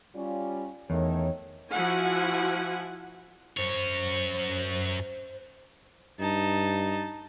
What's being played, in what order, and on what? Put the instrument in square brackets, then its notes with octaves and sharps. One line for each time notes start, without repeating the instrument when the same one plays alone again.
[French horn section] G3 C#4 F4
[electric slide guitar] E2 [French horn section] D#3 A3 C#5
[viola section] F3 E4 F#4 F#5 G#5
[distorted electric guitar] F#2 C#5 [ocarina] C5
[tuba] G2 [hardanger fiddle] D#4 A5